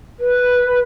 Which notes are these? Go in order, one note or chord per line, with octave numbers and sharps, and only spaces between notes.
B4